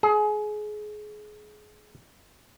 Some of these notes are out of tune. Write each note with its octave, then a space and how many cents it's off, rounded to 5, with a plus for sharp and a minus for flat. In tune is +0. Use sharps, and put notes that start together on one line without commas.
G#4 +25